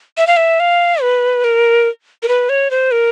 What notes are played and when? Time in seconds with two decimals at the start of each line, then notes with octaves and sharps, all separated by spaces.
0.17 E5
0.27 F5
0.37 E5
0.60 F5
1.02 B4
1.44 A#4
2.23 A#4
2.28 B4
2.49 C#5
2.71 C5
2.91 A#4